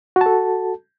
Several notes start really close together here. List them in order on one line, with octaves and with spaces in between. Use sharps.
F#4 A5 A4